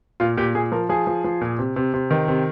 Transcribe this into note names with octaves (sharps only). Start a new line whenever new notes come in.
A#2 F4
A#2 G4
A#2 G#4
F3 A#4
F3 G#4
F3
F3
A#2
C3
C3
C3
D#3
C3